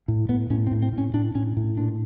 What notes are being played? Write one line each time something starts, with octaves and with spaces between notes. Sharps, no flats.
A2
A2 B3
A2 C#4
C4
A2
C4
A2
C#4
A2 D4
A2 C#4
A2
A#2 D4